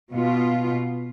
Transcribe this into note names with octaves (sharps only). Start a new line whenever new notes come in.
B2 B3 F4